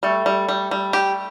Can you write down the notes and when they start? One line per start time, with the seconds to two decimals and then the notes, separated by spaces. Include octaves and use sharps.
0.03 G3 A3 A4
0.26 G3
0.49 G3
0.71 G3
0.93 G4